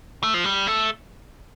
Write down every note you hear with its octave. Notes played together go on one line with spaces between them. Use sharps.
A3
F3
G3
A3